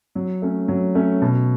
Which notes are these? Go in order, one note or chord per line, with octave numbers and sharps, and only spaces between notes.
F#3
A3 C#4
F#3
A3 C#4
B2